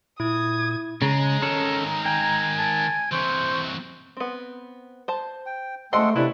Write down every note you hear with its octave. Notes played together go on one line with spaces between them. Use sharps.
A#2 E4 D#6 G#6
C#3 G#3 A#5
D#3 G#3 C#4 A4
G5 G#5
A5
C3 E3 C5 C#6
B3 C4
C5 A5
G5
G#3 A3 A4 C5 D#5 F#5 G5 C6
C3 E3 A3 D4 E4 B4